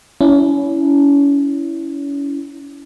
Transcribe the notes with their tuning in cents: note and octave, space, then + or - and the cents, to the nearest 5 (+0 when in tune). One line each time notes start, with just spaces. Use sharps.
C#4 +30 E4 +0